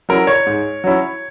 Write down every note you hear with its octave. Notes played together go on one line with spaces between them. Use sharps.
F#3 C#4 E4 A#4
C#5
G#2
F#3 C#4 E4